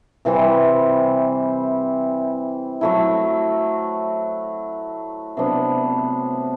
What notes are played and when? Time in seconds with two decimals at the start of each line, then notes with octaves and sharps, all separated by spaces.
0.25 C3 E3 G3 C4
2.81 F#3 A3 E4
5.37 C3 F#3 B3 D4